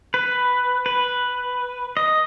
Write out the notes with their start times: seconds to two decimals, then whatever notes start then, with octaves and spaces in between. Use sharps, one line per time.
0.14 B4
0.86 B4
1.97 D#5